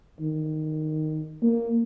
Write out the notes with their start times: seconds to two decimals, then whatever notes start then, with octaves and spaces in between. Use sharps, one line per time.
0.20 D#3
1.42 A#3